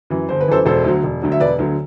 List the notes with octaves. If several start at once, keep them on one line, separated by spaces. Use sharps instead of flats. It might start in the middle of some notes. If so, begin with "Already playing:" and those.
F#2 E3
G1 C5
B4
F#2 E3 A4 C5
E1 A4 C5
D2 D3 F#3
E1
D2 D3 F#3
E5
E1 B4 D5
D2 D3 F#3